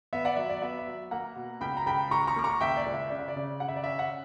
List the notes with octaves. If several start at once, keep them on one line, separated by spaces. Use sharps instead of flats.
B3 E5
D5 F#5
F#3 E5
D5
B3 E5
E5
F#3
A#3 F#5 A#5
B2
C#2 G5 B5
A#5
C#2 G5 B5
C#2 A#5 C#6
A#5 C#6
A#3 D6
A#5 C#6
C#2 E5 G5
D5
C#2
E5
C#3 D5
E5
D5
C#3
C#3 F#5
E5
D5
C#4 E5
F#5